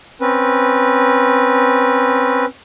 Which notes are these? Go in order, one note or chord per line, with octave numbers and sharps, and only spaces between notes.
C4 C#4 B4